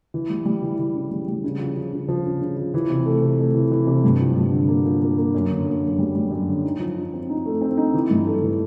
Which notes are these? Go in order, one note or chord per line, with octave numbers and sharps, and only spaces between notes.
E3
G3
G3
E3
E3
C#3
G3
G3
C#3
F3
F3
C#3
F3
C#3
C#3
F3
E3
C3
A3
C3
A3
E3
E3
C3
G2
F3
G2
D3
A#3
F3
A#3
A#3
F#2
D3
A#3
F#2
G3
G3
F#2
D3
D#4
F3
D#4
C4
D#4
A3
C4
D#4
E3
G2
A3
E3